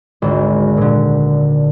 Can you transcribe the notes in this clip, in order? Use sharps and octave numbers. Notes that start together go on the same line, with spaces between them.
G#1 D2
A#2 D3